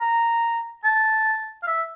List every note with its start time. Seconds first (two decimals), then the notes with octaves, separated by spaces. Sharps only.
0.01 A#5
0.85 A5
1.63 F5
1.67 E5